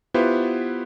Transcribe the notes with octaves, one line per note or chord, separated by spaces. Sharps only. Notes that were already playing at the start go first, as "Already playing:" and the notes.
B3 E4 F4 G4 B4 C5